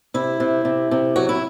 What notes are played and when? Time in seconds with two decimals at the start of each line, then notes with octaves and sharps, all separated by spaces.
0.14 C3 E4
0.40 C3
0.65 C3
0.91 C3
1.16 F#3 F#4
1.29 E4